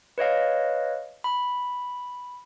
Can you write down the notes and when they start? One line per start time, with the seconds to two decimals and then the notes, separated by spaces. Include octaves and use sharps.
0.18 B4 C#5 D#5 F5
1.24 B5